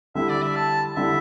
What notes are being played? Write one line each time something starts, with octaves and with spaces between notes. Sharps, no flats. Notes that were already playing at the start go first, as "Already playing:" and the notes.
D3 G3 E4 E5
D5
E5
A5
D3 G3 E4 E5